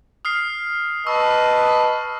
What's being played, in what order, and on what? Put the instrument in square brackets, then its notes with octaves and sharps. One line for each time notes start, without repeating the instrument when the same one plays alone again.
[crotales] D#6 F6 C7
[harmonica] B4 D#5 A5 [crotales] C#6 E6